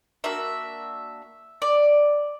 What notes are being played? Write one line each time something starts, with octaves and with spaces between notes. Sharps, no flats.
A#3 D4 F#4 E5
D5